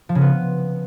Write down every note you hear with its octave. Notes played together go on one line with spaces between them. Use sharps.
F3
C#3
B3